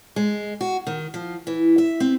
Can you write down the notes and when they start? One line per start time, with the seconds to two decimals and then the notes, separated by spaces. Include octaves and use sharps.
0.16 G#3
0.61 F#4
0.87 D#3
1.14 F3
1.47 E3
1.78 E5
2.00 C4